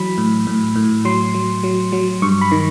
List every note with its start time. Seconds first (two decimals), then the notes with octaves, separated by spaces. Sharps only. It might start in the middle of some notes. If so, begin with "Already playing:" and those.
Already playing: E3 F#3 B5
0.18 A2
0.47 A2
0.76 A2
1.05 F#3 C6
1.34 F#3
1.64 F#3
1.92 F#3
2.22 G2 C#6
2.41 B5
2.52 D#3